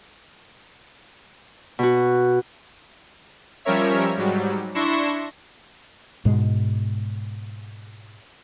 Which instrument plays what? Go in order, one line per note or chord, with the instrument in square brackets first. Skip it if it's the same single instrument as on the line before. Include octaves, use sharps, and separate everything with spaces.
[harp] B2 F#4
[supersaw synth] F3 G3 C#4 A#4 C#5 E5
G#2 F#3 G3
D4 E4 C6 C#6 A#6 E7
[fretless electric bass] G#2 B2 G#3